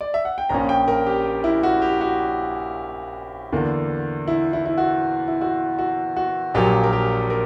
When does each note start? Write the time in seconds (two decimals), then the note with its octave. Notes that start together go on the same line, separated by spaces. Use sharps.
0.01 D5
0.14 E5
0.25 F#5
0.38 G5
0.49 A#1 A#2 A#3 C#4 A#5
0.69 G5
0.88 A#4
1.06 G4
1.44 E4
1.63 F#4
1.82 G4
2.01 F#4
3.52 E2 D3 A#3
4.28 E4
4.53 E4
4.66 E4
4.78 F#4
5.28 E4
5.41 F#4
5.79 F#4
6.16 F#4
6.54 A#1 A#2 F#3 A#3 G4
6.83 A#4
6.93 G4
7.30 A#4